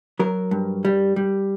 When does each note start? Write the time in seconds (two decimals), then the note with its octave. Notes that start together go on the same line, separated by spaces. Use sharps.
0.19 F#3 A#4
0.51 G2
0.85 G3
1.16 G3